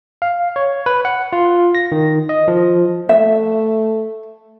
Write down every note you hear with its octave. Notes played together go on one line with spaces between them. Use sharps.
F5
C#5
B4
F#5
F4
A#6
D#3
D#5
F3
A3 E5